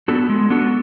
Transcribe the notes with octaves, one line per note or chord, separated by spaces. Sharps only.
B3 D4 F#4 A4
G#3
B3 D4 F#4 A4